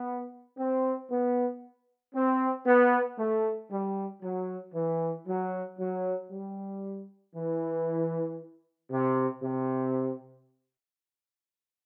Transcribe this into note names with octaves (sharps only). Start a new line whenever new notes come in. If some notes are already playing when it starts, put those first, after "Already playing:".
Already playing: B3
C4
B3
C4
B3
A3
G3
F#3
E3
F#3
F#3
G3
E3
C3
C3